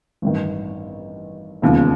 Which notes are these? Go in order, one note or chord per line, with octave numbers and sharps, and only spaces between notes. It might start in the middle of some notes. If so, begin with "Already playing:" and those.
A1 G2 D#3
E1 D#2 C#3 F3